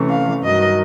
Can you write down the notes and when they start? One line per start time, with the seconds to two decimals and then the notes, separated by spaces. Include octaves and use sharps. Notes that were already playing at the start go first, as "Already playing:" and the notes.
Already playing: C3 E3 A3 C#4
0.09 F5
0.43 G2 D#3 F#3 D#5